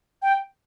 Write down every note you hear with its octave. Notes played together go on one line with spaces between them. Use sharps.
G5